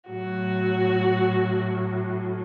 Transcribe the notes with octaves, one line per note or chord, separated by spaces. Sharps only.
A2 F#3 F#4